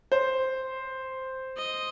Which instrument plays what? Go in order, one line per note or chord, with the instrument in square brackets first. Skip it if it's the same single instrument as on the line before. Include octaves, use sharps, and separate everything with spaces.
[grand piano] C5
[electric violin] D#5